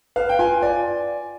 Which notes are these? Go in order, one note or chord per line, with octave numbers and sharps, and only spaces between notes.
B4 F5
G5
F4 G#5
D5 G#5